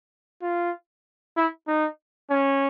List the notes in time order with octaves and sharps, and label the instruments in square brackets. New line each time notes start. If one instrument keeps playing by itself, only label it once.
[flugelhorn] F4
E4
D#4
C#4